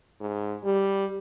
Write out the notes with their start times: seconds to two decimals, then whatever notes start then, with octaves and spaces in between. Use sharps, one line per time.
0.21 G#2
0.64 G3